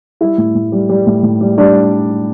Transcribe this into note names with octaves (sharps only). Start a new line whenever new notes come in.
G3 E4 E5
A2
A2
G3
G3
A2
A2
G3
G3 D4 D5